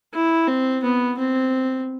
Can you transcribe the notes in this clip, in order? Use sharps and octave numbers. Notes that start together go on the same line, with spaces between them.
E4
C4
B3
C4